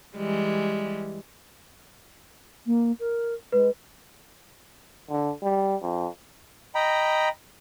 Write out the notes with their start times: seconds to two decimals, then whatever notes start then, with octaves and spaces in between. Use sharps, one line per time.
0.16 E3 G3 G#3
2.66 A#3
2.99 A#4
3.52 G#3 B4
5.10 D3
5.43 G3
5.82 F2
6.75 D#5 G5 A#5 B5